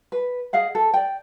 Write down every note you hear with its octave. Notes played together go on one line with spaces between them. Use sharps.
B4
G#4 D#5 F5 F#5
A4
D5 G5